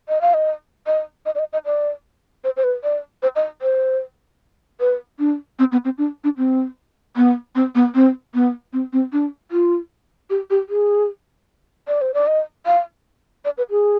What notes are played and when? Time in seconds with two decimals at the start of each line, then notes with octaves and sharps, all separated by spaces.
0.09 D#5
0.21 F5
0.34 D#5
0.87 D#5
1.26 D#5
1.35 D5
1.39 D#5
1.53 D#5
1.65 D5
2.44 C5
2.57 C5
2.64 B4
2.83 D5
3.23 C5
3.36 D#5
3.62 C5
4.80 B4
5.19 D4
5.59 C4
5.72 B3
5.85 C4
5.98 D4
6.24 D4
6.37 C4
7.16 B3
7.55 C4
7.75 B3
7.95 C4
8.34 B3
8.73 C4
8.93 C4
9.13 D4
9.51 F4
10.30 G4
10.50 G4
10.69 G#4
11.88 D5
12.01 C5
12.14 D5
12.27 D#5
12.66 F5
13.45 D5
13.58 B4
13.70 G#4